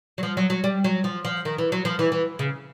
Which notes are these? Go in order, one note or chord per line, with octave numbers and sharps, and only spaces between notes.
F#3
F3
F#3
F#3
G3
F#3
F3
F3
D#3
E3
F#3
F3
E3
E3
C#3